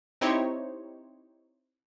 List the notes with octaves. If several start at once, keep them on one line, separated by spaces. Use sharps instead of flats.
C4 D#4 E4 G4 C5 C#5